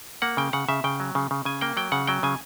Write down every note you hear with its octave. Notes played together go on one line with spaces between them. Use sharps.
A#3 F#5
C#3 G5
C#3 F#5
C#3 E5
C#3 G5
F#3
C#3
C#3
C#3 G#5
A#3 G5
F#3 G5
C#3 F#5
F#3 G5
C#3 G#5